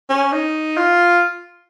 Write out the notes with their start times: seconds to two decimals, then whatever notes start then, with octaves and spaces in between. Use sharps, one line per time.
0.09 C#4
0.32 D#4
0.77 F4